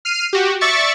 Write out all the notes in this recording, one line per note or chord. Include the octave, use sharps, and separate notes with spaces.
F6 C7 D#7
F#4 G4
D5 E5 C#6 A6 C#7